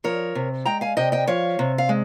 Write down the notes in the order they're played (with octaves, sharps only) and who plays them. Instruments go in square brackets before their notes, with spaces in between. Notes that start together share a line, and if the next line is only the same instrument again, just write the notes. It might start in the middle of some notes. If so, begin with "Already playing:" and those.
[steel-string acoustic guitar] F3 A#4 C#5
C3
G#3 G5 A#5
F5 G#5
C3 D#5 G5
D#5 G5
F3 C#5 F5
C3
F5
G#3